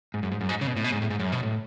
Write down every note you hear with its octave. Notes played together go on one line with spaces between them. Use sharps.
G#2
F#2
G#2
F#2
G#2
C#3
B2
A2
B2
G#2
A2
G#2
F#2
B2
A2